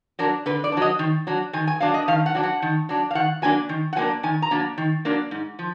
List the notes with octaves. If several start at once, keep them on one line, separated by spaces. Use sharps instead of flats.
F#3 D4 A#4
D3 B4
D5
D4
F#3 D#5
D#3
F#3 D4
D#3 G#5
G#5
F#3 D4 F5
D#5
D#3 F5
F#5
F#3 D4
F#5
D#3
F#3 D4
F5
D#3 F#5
F#3 A#3 D4 G#5
D#3
F#5
F#3 A#3 D4 G#5
D#3 G#5
A#5
F#3 A#3 D4
D#3
F#3 A#3 D4
G#2
F3